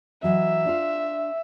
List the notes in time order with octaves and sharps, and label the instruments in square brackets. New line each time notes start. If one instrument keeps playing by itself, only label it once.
[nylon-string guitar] E3 F#3 D#5 [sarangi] E5
[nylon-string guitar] D4 F4 F5